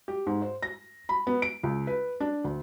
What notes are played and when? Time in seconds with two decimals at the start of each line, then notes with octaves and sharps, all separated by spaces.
0.08 G4
0.27 G#2
0.42 C5
0.63 A#6
1.09 B5
1.27 B3
1.42 D7
1.63 C#2
1.87 B4
2.20 D4
2.44 D2